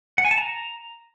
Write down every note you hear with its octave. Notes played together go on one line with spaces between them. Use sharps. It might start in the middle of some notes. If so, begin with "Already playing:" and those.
F#5
G#5
A5
A#5